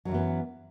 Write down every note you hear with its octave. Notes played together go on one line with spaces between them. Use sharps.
F#2 E3 F#3 B3